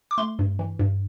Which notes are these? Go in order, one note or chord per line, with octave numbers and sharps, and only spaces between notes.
D6
A3 C6
G2
E3
G2